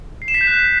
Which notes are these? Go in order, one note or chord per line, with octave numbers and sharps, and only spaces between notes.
C7
E7
B6
G6
F#6